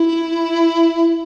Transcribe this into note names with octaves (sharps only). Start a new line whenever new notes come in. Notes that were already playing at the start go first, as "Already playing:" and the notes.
Already playing: E4